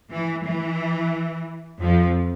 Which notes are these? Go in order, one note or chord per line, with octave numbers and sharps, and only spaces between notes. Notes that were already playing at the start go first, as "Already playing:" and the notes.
E3
E3
F2 F3